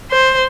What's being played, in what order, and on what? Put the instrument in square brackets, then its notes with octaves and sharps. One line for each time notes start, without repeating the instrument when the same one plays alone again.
[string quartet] C5